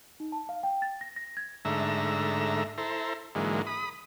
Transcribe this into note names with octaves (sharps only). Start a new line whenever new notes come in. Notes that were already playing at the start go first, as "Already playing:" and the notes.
D#4
A5
F5
G5
A6
A#6
A#6
G#6
G#2 D3 A3 E5 A#5
E4 A4 C5 A#5
G#2 D3 E3 F#3 G#3 A#3
B5 D#6